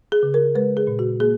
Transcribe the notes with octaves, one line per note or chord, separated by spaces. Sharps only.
G#4
C#3
A#4
G#3 B4
G#4
A#2
F#4
A#3 G#4